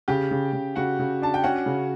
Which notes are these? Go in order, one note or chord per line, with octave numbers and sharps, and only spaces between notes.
C#3 G4 G5
C#3
C#3
C#3 F#4 F#5
C#3
D4 A5
G5
C#4 F#4 F#5
C#3